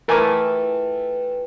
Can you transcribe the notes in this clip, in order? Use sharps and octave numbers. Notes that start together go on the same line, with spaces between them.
E3 A3 F4 A#4 B4 G5 G#5 D6